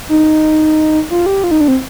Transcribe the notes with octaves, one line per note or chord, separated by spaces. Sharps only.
D#4
F4
G4
F4
D#4
D4
C4